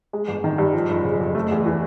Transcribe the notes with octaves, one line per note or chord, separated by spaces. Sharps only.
G#3
G1
D#3
G2
F3
F#1
C#3
F2
A3
E2
E3